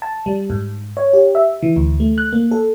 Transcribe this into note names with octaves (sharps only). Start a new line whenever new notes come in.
A5
G3
G#2
C#5
G4
E5
E3
D2
A3
F#6
A#3
A4